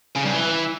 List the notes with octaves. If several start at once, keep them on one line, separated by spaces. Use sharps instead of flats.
C#3
G2
E3